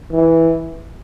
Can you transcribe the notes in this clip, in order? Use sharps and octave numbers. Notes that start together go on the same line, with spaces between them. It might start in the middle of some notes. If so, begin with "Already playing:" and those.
E3